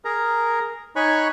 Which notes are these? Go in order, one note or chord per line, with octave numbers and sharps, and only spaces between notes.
G#4 A#4 A#5
D#4 C#5 G#5 B5 C#6 F#6